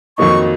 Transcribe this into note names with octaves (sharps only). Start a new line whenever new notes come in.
F2 D#3 F#3 A#3 D#4 C#6